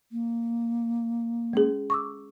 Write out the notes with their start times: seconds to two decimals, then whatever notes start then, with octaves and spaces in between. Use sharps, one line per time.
0.12 A#3
1.53 G#3 C#4 G#4
1.90 C#6 D6 E6